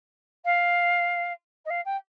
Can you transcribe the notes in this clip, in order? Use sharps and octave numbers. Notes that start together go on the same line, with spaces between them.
F5
D#5
F5
G5